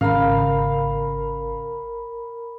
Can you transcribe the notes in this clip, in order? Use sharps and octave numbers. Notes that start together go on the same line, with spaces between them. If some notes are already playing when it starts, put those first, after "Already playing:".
G#1 C#3 A#4 F5 A#5 B5